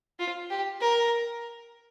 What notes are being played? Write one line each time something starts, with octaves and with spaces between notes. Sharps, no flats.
F4
G4
A#4